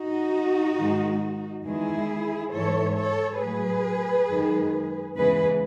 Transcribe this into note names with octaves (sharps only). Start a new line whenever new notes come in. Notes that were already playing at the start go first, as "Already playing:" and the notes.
Already playing: D#4 F#4
G#2 D#3 G#3
E2 D#3 G#3 E4 G#4
G#2 E3 G#3 A4 C#5
A4 C#5
A2 F#3 G#4 B4
F#2 D#3 G#3
E2 C#3 E3 G#3 G#4 B4